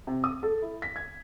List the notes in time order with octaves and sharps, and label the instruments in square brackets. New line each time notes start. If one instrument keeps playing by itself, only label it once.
[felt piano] C3
D#6
A4
E4
B6
G#6